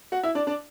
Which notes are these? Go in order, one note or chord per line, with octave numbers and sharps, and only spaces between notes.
F#4 F#5
E4 E5
D4 D5
D4 D5